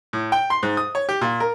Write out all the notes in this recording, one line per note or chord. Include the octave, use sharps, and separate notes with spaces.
A2
G5
C6
G#2
D#6
C#5
G4
A#2
A#4